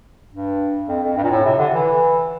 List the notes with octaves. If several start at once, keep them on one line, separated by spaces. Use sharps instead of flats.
G2
F2
F2
G2
A#2
A2
C3
D3
E3